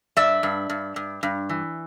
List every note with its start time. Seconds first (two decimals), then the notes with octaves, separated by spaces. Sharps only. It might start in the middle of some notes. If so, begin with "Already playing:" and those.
0.17 G2 D5 E5
0.43 G2
0.70 G2
0.96 G2
1.23 G2
1.49 E3